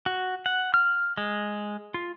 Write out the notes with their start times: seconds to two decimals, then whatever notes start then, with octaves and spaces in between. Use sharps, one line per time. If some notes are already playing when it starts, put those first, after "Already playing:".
0.06 F#4
0.46 F#5
0.74 F6
1.18 G#3
1.94 F4